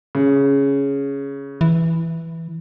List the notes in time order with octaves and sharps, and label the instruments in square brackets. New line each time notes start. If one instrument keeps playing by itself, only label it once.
[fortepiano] C#3
[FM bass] E3